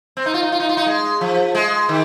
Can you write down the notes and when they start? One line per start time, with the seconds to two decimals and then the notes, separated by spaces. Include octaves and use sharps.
0.17 C4
0.26 D#4
0.34 F4
0.43 D#4
0.52 F4
0.60 D#4
0.69 F4
0.77 D#4
0.86 G#3
1.21 F3
1.55 G#3
1.89 D#3